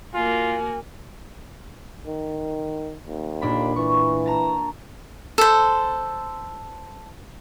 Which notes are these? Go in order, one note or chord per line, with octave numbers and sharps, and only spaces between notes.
A#3 F4 F#4 G#5
D#3
D#2
A#2 D4 B5
E3 C#6
A5 A#5
A4 C5